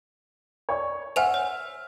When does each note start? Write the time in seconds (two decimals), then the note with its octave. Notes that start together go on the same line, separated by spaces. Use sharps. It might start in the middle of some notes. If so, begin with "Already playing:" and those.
0.69 C#5 D5 C#6
1.16 C5 E5 F#5 G#5 F6 F7
1.34 C#5